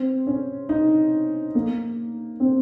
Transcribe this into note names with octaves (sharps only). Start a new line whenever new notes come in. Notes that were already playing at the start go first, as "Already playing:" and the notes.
Already playing: C4
C#4
D#4
A#3
C4